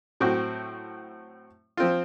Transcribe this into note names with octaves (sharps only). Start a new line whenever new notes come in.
A2 F#3 C4 F#4
F3 C4 F4